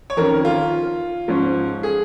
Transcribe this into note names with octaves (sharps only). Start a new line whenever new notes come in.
C#5
F2 D#3 C#4 A#4
F4
G#2 F3 C#4
G#4